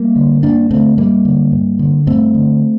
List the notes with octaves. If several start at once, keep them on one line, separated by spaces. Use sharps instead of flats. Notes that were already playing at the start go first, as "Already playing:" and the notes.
Already playing: G3 A#3
D3
G2 A#3 D4
D3 A3 C4
G2 G3 A#3
D3
G2
D3
G2 A3 C4
D3